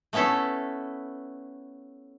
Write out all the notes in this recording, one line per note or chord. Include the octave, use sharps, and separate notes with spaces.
A3 B3 C#4 E4 A4